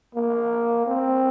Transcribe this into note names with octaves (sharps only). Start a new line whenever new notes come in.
A#3
C4